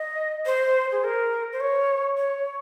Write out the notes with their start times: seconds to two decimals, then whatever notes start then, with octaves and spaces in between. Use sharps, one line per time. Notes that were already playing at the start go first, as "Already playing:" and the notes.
Already playing: D#5
0.46 C5
0.92 G#4
1.04 A#4
1.53 C5
1.60 C#5
2.17 C#5